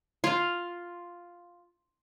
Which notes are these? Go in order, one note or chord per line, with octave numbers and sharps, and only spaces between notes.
F4 F5